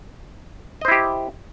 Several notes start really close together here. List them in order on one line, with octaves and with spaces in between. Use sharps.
D#5 C5 E4 G4